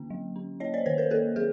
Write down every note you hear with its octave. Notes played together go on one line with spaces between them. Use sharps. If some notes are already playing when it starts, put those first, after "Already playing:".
Already playing: D3 A#3 C#4
F#3
C#4
A#3 C#5 D#5
C5 D5
D#3 B4 C#5
A#4 C5
A#3 A4 B4
F#3 G#4 A#4